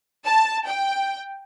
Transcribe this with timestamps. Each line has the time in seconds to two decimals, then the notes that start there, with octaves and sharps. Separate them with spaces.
0.25 A5
0.67 G5